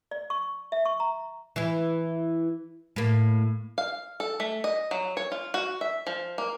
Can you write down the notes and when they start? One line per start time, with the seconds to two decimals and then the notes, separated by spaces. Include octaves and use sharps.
0.11 D5
0.30 C#6
0.72 E5
0.86 C#6
1.00 A#5
1.56 E3 E4
2.96 A2 A#3
3.78 F5
4.20 A4
4.40 A3
4.64 D#5
4.91 F#3
5.17 C#5
5.32 F4
5.54 F#4
5.81 E5
6.07 F3
6.38 A#3